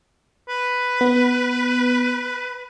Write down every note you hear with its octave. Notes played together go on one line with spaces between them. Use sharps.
B4
B3